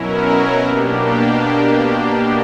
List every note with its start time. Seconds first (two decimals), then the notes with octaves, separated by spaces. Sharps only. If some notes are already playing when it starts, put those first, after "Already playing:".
Already playing: B2 F#3 C#4 E4 A#4
0.60 B2 A#3 D4 G4